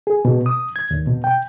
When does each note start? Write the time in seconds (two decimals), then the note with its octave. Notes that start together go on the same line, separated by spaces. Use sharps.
0.07 G#4
0.25 B2
0.46 D#6
0.76 G#6
0.91 D#2
1.07 B2
1.24 G5